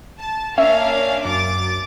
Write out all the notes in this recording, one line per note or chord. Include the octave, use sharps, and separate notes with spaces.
A5
A#3 C#4 D4 E5 F5
F#2 D6 A6